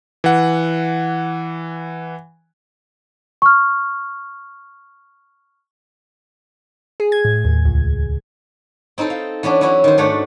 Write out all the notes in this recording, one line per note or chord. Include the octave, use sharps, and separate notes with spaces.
E3 F#5
C#6 F6
G#4
G#6
A2
D#2
C#2
C4 D#4 E4 A4 C5
F5
E3 B3 C#4 D4
E3 F#3 C#4 E4 F#4
D#3 C5
G#2 A3 D4 C#5 F#5